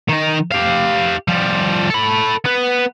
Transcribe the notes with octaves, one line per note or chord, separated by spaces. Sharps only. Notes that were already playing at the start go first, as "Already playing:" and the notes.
D#3 D#4
G4 F5
F3 G3
A4 B5
B3 B4